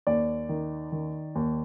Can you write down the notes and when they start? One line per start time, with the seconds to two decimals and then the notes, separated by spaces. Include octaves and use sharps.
0.07 D#2 D5
0.49 D#3
0.92 D#3
1.35 D#2